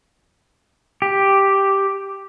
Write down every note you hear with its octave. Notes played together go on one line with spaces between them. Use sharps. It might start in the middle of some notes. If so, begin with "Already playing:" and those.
G4